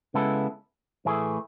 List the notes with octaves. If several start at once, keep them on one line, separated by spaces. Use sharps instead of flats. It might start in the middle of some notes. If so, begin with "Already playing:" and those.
C#3 G#3 B3 E4 A4
A2 E3 A3 E4 G#4